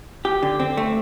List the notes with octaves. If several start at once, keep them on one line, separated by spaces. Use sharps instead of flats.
G4
D3
C4
A3